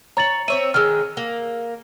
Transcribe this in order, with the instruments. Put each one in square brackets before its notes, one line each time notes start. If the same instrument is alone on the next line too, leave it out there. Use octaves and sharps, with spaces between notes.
[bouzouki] C#5 [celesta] A#5 A6 F#7
[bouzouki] C4 C#5 E5 [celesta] D#7
[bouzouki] D#3 G#3 [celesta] E6 F6
[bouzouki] A#3